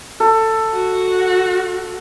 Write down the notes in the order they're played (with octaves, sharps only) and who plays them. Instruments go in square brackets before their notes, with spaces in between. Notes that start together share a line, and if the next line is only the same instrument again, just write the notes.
[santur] A4
[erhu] F#4